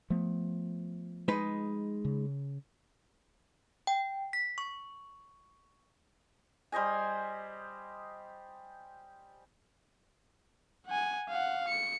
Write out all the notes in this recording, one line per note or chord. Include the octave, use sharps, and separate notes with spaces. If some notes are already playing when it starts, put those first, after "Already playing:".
F3 A3 B3
G#3 D#4 B4
C#3
G5
B6
C#6
G3 C5 D#5 G#5
F#5 G#5
F5 F#5
C#7